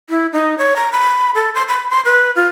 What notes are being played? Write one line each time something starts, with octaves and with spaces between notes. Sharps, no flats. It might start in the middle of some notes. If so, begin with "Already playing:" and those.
E4
D#4
C#5
A#5
B5
A4
C6
B5
C6
B4
F4